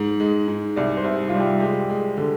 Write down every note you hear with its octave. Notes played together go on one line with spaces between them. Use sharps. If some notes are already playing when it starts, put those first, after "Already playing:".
Already playing: G#2
G#3
G#2
C2 D5
C5
C2
G3 F4
G4
G#3 G4
G#3
D3